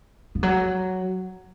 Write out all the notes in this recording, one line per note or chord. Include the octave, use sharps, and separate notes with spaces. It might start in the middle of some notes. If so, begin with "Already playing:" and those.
F3
F#3